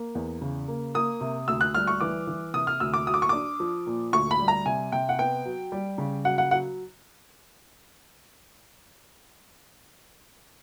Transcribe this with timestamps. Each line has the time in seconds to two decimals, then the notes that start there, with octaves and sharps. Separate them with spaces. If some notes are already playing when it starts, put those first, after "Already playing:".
Already playing: A#3
0.15 E2
0.41 C#3
0.68 A#3
0.94 A#3 D#6
1.21 C3
1.48 D2 E6
1.61 F#6
1.74 G3 F6
1.87 C#6
2.01 E3 D6
2.27 E3
2.54 C3 D#6
2.67 F6
2.80 D2 E6
2.94 D6
3.07 F#3 D#6
3.14 D6
3.22 C#6
3.29 D4 D6
3.60 F3
3.87 A#2
4.13 D2 C#6
4.31 B5
4.40 G3
4.48 A#5
4.66 C3 G#5
4.92 C3 G5
5.09 F#5
5.19 B3 G5
5.45 F#3
5.72 G3
5.98 C#3
6.25 F#3 F#5
6.38 F#5
6.51 F#3 F#5